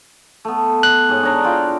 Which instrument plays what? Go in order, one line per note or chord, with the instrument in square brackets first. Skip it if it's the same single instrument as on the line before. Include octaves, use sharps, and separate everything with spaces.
[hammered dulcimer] A3 B3
[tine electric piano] F#6
[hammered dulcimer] G#2 G#4 C#5
D4 C#5 A#5
E4 F4 G5